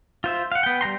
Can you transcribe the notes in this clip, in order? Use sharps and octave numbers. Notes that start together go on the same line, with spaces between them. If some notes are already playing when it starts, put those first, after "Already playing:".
F4 C5 E5
F5 F#5
B3 G5
G3 G5 A#5 C6